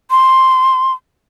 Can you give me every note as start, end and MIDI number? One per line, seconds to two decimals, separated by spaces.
0.10 0.93 84